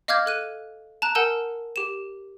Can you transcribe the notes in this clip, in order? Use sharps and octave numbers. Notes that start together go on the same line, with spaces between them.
D#5 F5 D6 F6 G6 G#6
A4 F#6 D#7
A5 A#5 F#6
A#4 F#5 G#5 A5 E6 G6
G4 E7